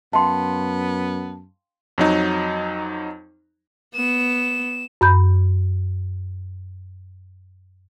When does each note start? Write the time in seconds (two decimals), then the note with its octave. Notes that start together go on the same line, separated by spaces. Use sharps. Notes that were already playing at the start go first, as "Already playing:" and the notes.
0.13 F#2 B3 F5 G5 A5 C6
1.98 F2 F#3 D#4
3.95 B3 E7
5.01 F#2 B5 G6